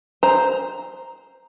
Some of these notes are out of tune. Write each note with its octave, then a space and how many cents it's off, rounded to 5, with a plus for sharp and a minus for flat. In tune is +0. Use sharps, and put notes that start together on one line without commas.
C5 +0 A#5 +0